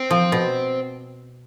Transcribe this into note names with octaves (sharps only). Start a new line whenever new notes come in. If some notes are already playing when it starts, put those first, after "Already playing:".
Already playing: C4
F3
B2